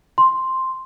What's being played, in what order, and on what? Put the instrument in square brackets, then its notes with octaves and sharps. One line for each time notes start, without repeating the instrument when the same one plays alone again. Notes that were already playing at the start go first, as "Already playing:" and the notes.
[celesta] C6